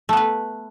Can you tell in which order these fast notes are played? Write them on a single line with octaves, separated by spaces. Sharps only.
A3 B3 B4